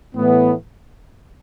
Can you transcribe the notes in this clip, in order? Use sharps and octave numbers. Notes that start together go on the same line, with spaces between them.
A2 E3 B3